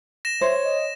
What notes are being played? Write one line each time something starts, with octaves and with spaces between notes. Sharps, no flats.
A#6 E7
C5 C#5 E5
D#5